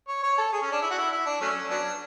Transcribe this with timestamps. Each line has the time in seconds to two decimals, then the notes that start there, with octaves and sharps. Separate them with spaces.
0.08 C#5
0.23 C#5
0.38 A4
0.53 G#4
0.62 C#4
0.72 D4
0.82 E4
0.90 F#4
0.98 E4
1.12 E4
1.26 D4
1.41 F#3 A3 C#4
1.70 F#3 B3 D4